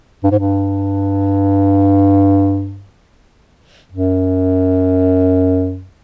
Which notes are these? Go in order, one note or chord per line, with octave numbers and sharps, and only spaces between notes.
G2
G#2
G2
F#2